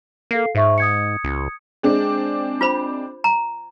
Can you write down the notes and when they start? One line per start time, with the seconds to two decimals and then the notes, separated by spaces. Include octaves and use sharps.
0.31 A#3 A4 F5 C7
0.55 G#2 C5 E5 C#6
0.78 D#6 G#6 C#7
1.24 C#2
1.83 G#3 C4 D4
2.61 F4 C5 B5
3.24 A#5